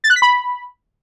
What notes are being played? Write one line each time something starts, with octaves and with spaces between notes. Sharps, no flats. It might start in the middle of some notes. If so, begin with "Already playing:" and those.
A6
F#6
B6
B5